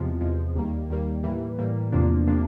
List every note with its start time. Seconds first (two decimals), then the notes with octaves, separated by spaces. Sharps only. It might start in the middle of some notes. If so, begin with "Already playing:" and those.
Already playing: E2 C3 F3 G#3
0.21 E2 C3 F3 G#3
0.55 D#2 D#3 G3 A#3
0.89 D#2 D#3 G3 A#3
1.23 A2 E3 G3 A#3
1.58 A2 E3 G3 A#3
1.92 E2 C3 F3 A#3 D4
2.27 C3 F3 A#3 D4